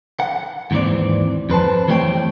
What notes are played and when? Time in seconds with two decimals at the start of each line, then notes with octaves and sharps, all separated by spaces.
0.20 F#5
0.71 D#2 G#2 E3 C4 D5
1.50 F2 B4 C5 A5
1.88 E3 G3 A3 C4 C#5 G5